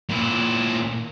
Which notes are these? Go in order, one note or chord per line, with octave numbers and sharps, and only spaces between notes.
A#2 E4